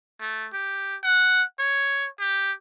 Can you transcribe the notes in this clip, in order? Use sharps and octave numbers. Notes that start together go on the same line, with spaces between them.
A3
G4
F#5
C#5
G4